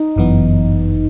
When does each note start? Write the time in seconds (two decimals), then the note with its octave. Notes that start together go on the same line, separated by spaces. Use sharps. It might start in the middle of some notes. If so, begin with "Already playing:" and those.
Already playing: D#4
0.16 G1 F#2 E3 B3